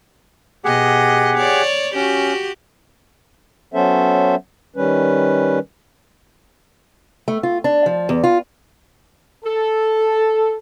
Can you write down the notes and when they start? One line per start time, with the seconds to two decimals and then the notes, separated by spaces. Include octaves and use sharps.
0.64 B2 G4 G#4 D#5 F#5
1.37 C#5 D5
1.95 C#4 F#4 G4
3.74 F#3 B3 C#4 A4 C5 E5
4.76 D#3 G3 C#4 B4
7.28 A3
7.43 F4
7.64 D4
7.86 F3
8.09 E2
8.24 F4
9.44 A4